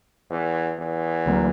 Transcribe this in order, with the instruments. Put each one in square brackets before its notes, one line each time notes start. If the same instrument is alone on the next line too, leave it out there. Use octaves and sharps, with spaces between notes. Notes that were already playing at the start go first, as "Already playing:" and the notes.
[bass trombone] E2
E2
[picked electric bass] D2 D3 F#3 A#3